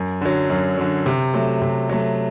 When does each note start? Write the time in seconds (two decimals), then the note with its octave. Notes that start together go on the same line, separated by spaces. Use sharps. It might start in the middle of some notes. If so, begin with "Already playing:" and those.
Already playing: F#2
0.21 D3 F#3
0.50 F#2
0.78 D3 F#3
1.06 C3
1.34 F#3 A3
1.62 C3
1.89 F#3 A3